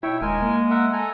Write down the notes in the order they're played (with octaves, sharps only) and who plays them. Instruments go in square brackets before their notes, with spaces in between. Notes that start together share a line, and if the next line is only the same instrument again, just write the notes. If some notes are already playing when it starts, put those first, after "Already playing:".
[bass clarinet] B2 [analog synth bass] E4 [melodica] C#5 E5 G5
[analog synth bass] D#1 [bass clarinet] G#3 [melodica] A#4 G#5
[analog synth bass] A#3
[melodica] A#4 E5 F#5
A4 G#5 A#5